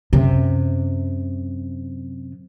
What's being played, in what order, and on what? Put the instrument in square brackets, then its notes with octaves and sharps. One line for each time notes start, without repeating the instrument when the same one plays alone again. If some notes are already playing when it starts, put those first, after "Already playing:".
[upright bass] F#2 C3